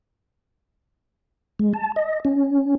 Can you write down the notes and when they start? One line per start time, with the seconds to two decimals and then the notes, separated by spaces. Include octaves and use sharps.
1.59 G#3
1.74 A5
1.96 D#5
2.25 C#4